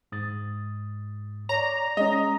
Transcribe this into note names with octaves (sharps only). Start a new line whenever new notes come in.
G#2 D#6 A6
C#5 D5 A#5
G#3 C#4 D#5